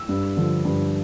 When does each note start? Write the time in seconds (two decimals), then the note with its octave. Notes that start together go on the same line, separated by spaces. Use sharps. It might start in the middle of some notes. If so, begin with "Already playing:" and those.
Already playing: E6
0.09 G2
0.37 D3 F3
0.65 G2